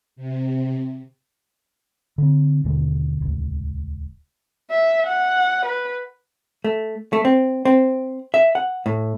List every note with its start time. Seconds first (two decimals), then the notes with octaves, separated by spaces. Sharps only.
0.16 C3
2.18 D3 C4
2.64 D#2 B2 D3 A3
3.21 D#1 C#2
4.71 E5
5.07 F#5
5.66 B4
6.64 A3
7.13 A3
7.25 C4
7.65 C4
8.34 E5
8.55 F#5
8.86 A2